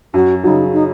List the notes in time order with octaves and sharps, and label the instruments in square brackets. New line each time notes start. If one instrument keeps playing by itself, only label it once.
[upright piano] F#2 [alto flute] F#4
[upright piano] C#3 F#3 [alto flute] D#4
[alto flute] D#4